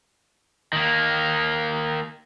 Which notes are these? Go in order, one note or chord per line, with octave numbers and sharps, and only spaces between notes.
D#3 A#3